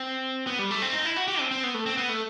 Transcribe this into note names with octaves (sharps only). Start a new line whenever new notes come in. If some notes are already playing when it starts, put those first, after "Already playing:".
Already playing: C4
B3
G3
A3
C4
D#4
E4
F#4
G4
C4
C4
B3
A3
C4
B3
A3